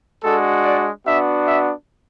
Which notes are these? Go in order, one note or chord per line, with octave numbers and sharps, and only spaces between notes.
G#3 D4 F#4 A4
D5
B3 D4 F#4 E5
E5